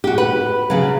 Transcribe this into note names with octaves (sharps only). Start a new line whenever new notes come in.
F#4 G4
B4
C#3 F#3